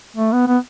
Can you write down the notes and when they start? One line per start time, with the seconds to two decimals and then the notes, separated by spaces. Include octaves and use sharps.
0.16 A3
0.32 B3
0.47 B3